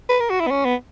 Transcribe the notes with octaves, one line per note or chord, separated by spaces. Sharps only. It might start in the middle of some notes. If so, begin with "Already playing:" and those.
B4
A#4
F#4
E4
B3
C#4
B3